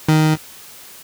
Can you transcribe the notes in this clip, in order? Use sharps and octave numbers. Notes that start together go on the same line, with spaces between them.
D#3